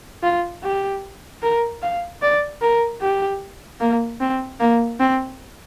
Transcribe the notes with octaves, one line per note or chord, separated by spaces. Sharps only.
F4
G4
A#4
F5
D5
A#4
G4
A#3
C4
A#3
C4